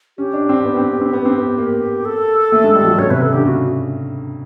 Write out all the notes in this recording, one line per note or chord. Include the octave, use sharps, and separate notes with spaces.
C#4 G4
D4
C4
B3
C4
B3
C4
B3
C4
B3
A#3
A4
A3
G#3
G3
F#3
C#3 C#5
C3 B4
C#3 A4
D3 G4
C#3 F#4